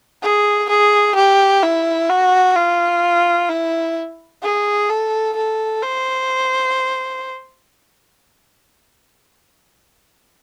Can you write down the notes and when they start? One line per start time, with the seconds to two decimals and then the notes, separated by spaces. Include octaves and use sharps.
0.23 G#4
0.70 G#4
1.15 G4
1.63 E4
2.10 F#4
2.56 F4
3.49 E4
4.43 G#4
4.89 A4
5.36 A4
5.83 C5